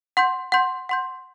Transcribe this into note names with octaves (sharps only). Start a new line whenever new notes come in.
F#5 C6 G6
F#5 C6 G6
F#5 C6 G6